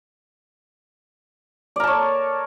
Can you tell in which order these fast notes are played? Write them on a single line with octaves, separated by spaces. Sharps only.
D5 A#4 A5 C#5